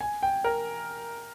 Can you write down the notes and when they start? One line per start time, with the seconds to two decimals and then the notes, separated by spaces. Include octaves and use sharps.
0.01 G#5
0.23 G5
0.44 A#4